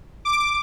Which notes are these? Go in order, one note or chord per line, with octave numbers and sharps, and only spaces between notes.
D6